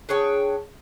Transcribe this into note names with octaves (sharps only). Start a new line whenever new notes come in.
D4 G#4 C#5 G5